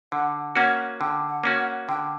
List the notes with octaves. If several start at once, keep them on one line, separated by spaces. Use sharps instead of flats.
D3 F#5
A#3 C#4 F#4 F#5
D3 G5
F#5
A#3 C#4 F#4
F#5
D3 G5